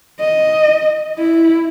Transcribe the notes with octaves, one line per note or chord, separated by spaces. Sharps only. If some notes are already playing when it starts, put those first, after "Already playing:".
D#5
E4